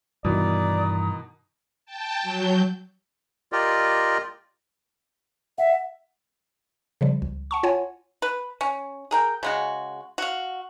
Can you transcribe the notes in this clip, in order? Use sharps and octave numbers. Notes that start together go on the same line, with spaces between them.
G2 B2 D#3 E3 D5 A#5 D#6
G5 A5
F#3 G6
F4 G4 A#4 D5 D#5
E5 F#5
C#3 F3 G3
C#2
F#5 A5 C#6
F4 C#5 F#5 G#5
B4
C#4
G#4 A#4 G5
C#3 G#3 F#4
F#4 F5